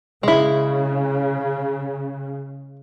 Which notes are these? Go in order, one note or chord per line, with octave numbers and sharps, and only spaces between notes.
C#3 G#3 E4